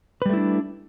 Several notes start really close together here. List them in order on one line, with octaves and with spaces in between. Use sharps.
B4 G3 A3 E4 D4